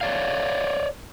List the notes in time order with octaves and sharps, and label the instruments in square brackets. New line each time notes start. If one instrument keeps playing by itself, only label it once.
[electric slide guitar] C#5 D5 F5